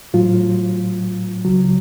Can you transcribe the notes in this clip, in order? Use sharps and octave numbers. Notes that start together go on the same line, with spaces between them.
A2 F#3 F4
C#2 C#3 F#3